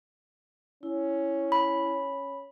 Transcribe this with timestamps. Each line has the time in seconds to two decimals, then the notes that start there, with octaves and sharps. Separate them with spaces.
0.83 C#4 E4
1.52 B5